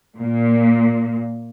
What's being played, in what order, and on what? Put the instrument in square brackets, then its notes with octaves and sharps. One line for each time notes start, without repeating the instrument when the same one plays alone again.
[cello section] A#2